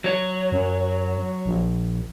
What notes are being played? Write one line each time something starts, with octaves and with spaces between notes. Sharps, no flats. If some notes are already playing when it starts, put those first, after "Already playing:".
F#3 C#5
F#2
A#1